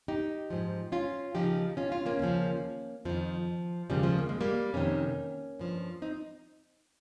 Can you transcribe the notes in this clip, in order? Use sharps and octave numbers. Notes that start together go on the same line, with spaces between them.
D#4 G4
G#2 F3
C#4 F4
D#2 C#3 F3 D#4 G4
C#4 F4
C#4 F4
A#3 C#4
D#2 C#3 F3
F2 D#3 F3
D#2 C#3 F3 G3
F3 G#3
A#3
G#3
G3 A#3
F2 C3 D#3 A#3 C#4
G2 F3
C4 D#4